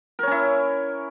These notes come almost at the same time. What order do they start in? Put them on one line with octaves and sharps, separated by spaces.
A#4 C#5 C#4 E4